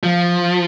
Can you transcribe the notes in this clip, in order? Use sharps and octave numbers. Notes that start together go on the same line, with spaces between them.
F3